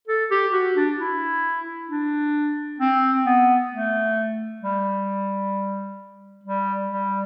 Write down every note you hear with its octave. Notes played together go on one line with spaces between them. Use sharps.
A4
G4
F#4
D4
E4
D4
C4
B3
A3
G3
G3
G3